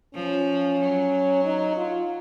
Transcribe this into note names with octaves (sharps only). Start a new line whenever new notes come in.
F3 C#4
F#3
D#4
F4